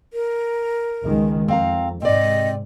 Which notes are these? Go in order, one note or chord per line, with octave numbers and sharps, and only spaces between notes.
A#4
C#2 D#3 G#3
F2 C4 F5 A#5
G#2 C3 C4 D5 D#5